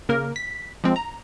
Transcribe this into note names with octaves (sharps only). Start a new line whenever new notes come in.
C#3 A#3 A#4
B6
F3 G#3 C4
A#5